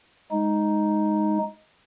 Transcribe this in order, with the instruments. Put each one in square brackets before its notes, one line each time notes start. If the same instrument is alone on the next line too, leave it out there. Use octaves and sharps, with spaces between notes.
[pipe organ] G#3 D#4